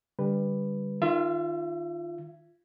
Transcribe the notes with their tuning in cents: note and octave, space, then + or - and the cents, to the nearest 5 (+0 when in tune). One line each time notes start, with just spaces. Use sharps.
D3 +0 G3 +20 B4 +5
D#3 -15 F4 -10 E5 +35